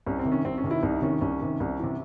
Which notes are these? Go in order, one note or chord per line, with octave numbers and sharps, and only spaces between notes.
C2 C#4
C4
C3 D#3
C#4
C2 C4
C#4
C3 D#3
E4
C2 D#4
C3 D#3 C#4
C2 C#4
C3 D#3
C2
C3 E3